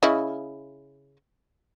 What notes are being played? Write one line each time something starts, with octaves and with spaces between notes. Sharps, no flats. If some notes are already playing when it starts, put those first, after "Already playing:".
C#3 E4 D#5